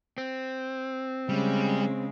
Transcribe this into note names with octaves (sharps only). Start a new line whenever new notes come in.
C4
C#3 G3 G#3